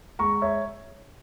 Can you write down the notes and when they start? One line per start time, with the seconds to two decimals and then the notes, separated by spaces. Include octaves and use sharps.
0.19 G#3 A#5 C#6
0.42 C#5 E5